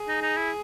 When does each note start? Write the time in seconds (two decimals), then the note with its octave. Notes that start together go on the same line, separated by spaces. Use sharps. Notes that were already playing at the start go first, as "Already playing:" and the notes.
Already playing: G#4
0.08 D#4
0.22 D#4
0.37 E4